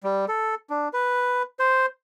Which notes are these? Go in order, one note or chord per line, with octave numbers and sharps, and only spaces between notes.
G3
A4
D4
B4
C5